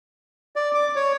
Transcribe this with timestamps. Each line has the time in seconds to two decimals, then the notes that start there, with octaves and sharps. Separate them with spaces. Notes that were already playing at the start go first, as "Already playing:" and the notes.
0.56 D5
0.74 D6
0.96 C#5